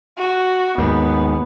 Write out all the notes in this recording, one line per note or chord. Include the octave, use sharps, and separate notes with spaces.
F#4
D#2 G#2 B3